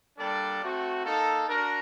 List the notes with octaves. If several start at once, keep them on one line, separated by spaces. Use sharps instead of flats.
G3 A#3 D4 A4 D5
A3 C4 F#4
A#3 D#4 A4
D4 F#4 A#4